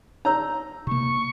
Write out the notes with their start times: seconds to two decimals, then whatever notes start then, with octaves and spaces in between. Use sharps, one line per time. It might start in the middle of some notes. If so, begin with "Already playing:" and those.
0.25 D#4 C#5 A#5 E6
0.87 C3 A#3 C#6